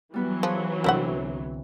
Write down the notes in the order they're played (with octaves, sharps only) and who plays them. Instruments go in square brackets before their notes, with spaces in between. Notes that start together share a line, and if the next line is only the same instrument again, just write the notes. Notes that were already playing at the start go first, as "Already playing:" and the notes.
[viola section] E3 F#3 [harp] G3 B3 B4
[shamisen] F3 [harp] G#4 B4 C#5
[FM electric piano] C2 D3 C4 [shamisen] A#3 E4 F#5 [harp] E5